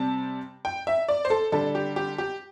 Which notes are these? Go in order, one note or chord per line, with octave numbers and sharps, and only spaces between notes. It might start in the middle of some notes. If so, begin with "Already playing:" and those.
Already playing: C3 G3 C4 A5
G5
E5
D5
C5
A4
D3 G3 D4 A4
G4
G4
G4